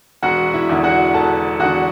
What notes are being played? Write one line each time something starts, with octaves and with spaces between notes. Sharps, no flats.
E1 F#4 F#5
E4 E5
E2 D3
F#4 F#5
E1 A4 A5
E2 D3 F#4 F#5